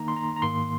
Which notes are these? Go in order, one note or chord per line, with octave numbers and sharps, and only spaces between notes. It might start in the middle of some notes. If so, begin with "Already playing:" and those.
Already playing: D#3 A#3 D#4 A#5
C6
A#5
A#5
G#2 D#3 A#3 C6